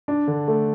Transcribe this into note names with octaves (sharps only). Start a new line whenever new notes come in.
D4
D3
A3